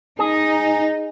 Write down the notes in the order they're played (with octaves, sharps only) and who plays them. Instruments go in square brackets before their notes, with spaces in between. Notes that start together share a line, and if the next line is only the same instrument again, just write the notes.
[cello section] D#4 [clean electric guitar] G#4